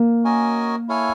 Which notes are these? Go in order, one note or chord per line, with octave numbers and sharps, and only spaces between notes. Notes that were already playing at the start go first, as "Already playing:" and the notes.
Already playing: A#3
C#4 F#4 A#4 D#5 G#5
E4 A4 C#5 F5 G#5